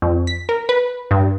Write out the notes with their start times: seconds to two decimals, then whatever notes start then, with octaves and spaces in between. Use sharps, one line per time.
0.02 F2
0.27 B6
0.49 A#4
0.69 B4
1.11 G2